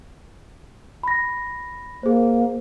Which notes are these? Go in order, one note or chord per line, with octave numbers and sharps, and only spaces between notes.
B5 A#6
A#3 G#4 C5